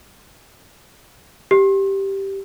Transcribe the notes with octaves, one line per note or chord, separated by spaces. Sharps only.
G4